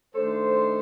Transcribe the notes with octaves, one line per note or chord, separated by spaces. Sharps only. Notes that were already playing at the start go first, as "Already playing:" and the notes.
D#3 A3 D4 A4 C5